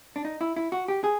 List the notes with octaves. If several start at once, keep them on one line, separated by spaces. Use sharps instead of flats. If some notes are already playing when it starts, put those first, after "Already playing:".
D4
D#4
E4
E4
F#4
G4
G#4